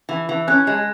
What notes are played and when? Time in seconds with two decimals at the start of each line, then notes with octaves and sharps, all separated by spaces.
0.09 E3
0.29 E3
0.47 C#4 F#6
0.67 G#3